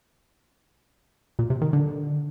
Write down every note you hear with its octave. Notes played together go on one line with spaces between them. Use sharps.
A#2
C3
D#3
D3